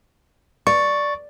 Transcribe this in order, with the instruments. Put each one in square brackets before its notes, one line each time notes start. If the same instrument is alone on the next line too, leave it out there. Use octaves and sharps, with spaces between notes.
[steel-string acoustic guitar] D5 [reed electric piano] C#6